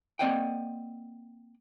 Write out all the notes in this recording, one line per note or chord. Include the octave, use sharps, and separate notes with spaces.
A#3 C4 D5 D#5 F#5 G5